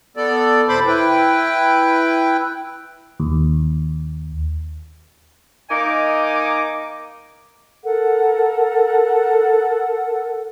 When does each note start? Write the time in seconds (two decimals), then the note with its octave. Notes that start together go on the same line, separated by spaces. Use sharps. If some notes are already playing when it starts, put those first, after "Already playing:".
0.17 B3 A4 D5
0.69 F2 C3 C5 B5 C6 D6
0.86 E4 B4 G5
3.20 D#2
5.70 A#3 D#4 D#5 G#5 D6
7.84 A4 A#4 F#5